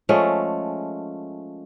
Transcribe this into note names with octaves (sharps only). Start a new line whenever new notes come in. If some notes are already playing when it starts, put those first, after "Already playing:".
F3 G#3 A3 C#4